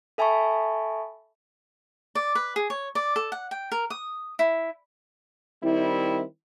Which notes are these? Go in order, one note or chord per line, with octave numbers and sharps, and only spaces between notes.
A4 E5 G#5 A5 B5 C#6
D5
B4
G#4
C#5
D5
A4
F#5
G5
A#4
D#6
E4
D#3 G3 C4 E4